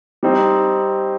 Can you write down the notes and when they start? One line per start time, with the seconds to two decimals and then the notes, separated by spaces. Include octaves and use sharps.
0.23 G3 C4 D#4